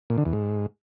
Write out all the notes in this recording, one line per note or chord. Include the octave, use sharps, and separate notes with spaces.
A#2
D3
E2
G#2